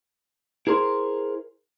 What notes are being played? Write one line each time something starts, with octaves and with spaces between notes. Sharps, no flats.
E4 G#4 A#4 C5 C6